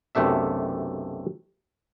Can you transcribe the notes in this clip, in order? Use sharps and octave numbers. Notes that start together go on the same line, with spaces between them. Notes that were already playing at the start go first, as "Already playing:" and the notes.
B1 F#2 C3 A3 D4 E5